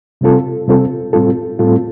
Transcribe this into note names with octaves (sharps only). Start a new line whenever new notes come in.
C3 G3 C4 F4 A4
C3 G3 C4 F4 A4
A2 G3 C4 F4 A4
A2 G3 C4 F4 A4